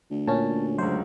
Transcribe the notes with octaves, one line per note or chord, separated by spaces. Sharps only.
D2
A#2 C#4 A5
C#2 F#2 C5